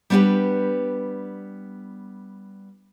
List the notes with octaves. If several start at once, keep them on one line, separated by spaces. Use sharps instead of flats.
G3 B3 D4 E4 G4 B4